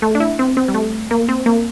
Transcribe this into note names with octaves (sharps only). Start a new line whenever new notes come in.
A3
D4
E4
C4
C4
G3
A3
A#3
C4
A#3